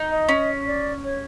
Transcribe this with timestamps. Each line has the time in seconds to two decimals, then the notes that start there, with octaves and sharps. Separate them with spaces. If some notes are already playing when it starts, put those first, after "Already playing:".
Already playing: D#4
0.10 D#5
0.29 C#4
0.66 D5
1.03 C#5